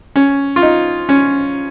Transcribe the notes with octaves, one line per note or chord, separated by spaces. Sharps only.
C#4
F4
D#4
C#4